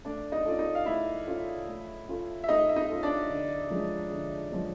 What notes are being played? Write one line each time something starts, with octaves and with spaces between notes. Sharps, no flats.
A3 D4 D5
D#4 D#5
C#4 F4 A4 D5
D#4 D#5
F5
A3 E4 E5
C#4 F4 A4
A3
C#4 F4 A4
E5
A3 D#4 D#5
E5
D#4 D#5
C#4 F4 A4
D4 D5
D3
F3 G#3 C#4
D3
F3 G#3 C#4